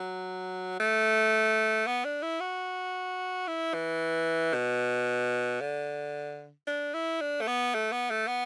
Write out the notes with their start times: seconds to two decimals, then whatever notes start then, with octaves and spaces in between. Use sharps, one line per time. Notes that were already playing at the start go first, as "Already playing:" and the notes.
Already playing: F#3
0.80 A3
1.87 B3
2.05 D4
2.23 E4
2.40 F#4
3.48 E4
3.74 E3
4.54 B2
5.61 D3
6.67 D4
6.94 E4
7.21 D4
7.41 A3
7.48 B3
7.75 A3
7.92 B3
8.10 A3
8.28 B3